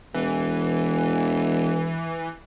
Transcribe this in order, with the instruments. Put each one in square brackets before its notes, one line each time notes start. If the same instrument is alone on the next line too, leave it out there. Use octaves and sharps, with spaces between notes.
[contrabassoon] E1 [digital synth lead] E3